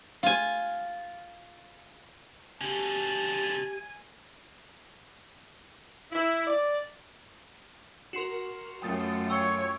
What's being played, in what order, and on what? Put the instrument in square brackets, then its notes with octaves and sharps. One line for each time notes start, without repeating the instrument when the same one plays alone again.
[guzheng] F4 G#5
[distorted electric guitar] B2 D3 [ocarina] G4 [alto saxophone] G#5 [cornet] A5
[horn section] E4
D5
[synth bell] F#4 A#4 [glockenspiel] C6 C7 E7
[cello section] F#2 A3 F4 [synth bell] G5 D#6 A6
[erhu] C#5 [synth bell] G5 C#7 [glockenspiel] C#6 E6